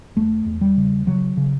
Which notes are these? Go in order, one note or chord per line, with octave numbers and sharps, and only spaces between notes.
E2 A3
E2
G3
C#3
C#3 F#3
C#3